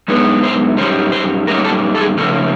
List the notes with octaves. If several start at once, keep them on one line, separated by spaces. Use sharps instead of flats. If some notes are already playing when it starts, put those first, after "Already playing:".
F#2 D#3 G#3 B3 D4
C5
F#2 D#3 G3 A#3 C#4 C5
C5
F#2 D#3 G3 A#3 C#4 A#4
A4
A4
G#4
C#3 F3 A3 C#4 A4